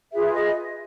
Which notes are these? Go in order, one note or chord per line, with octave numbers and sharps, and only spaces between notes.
F4 G#4 B4 E5
D#5